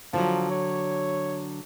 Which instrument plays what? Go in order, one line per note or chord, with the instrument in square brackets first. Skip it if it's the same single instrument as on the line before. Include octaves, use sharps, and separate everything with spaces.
[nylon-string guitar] D3 F#3 [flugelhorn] F3
[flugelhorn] C#5